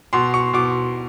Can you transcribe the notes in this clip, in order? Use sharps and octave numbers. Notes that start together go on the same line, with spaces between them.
B2 C6
C#6
B2 D6